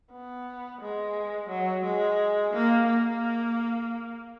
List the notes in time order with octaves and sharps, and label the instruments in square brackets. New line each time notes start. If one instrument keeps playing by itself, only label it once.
[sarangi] B3
G#3
F#3
G#3
A#3
A#3